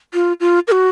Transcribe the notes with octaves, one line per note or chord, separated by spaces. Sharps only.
F4
F4
A#4
F#4